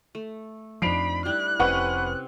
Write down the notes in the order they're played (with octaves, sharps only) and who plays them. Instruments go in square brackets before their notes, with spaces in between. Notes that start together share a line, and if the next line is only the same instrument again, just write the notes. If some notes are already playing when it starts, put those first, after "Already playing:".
[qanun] A3
[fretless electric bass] F2 F3 [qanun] D4 D#4 [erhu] B5 [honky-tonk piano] C7 D7 F7
[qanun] G3 E4 G4 [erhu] F#6
[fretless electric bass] F1 [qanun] C3 C#4 G4 [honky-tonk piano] B4 F#5 C#6